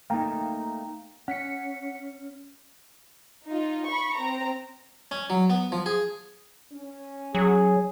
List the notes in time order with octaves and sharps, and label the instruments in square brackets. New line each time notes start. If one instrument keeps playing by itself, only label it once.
[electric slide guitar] A3 A#3 D#4 [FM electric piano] F5 G5 A#5
[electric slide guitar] C#4 [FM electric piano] F#5 B6 C#7
[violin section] D#4 F4
B5 C#6
C4 A#5
[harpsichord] C#4
F#3
B3
F3
G#4
[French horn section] C#4
[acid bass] F#3 [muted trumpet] G#4